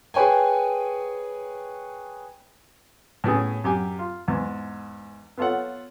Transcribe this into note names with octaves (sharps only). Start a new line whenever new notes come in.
G#4 B4 C#5 G5 G#5
A2 B3 C#4 G#4
F#2 G4 G#5
F4
E2 G#2
B3 F4 A4 C#5 F#5